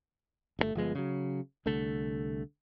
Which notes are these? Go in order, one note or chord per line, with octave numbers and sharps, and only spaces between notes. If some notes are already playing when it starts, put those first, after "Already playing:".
G1 C3 A3
G1 F3 G#3 B3
C#3 F#3
C2 D3 A3